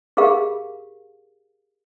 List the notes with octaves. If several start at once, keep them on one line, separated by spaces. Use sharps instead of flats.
G4 G#4 A#4 F5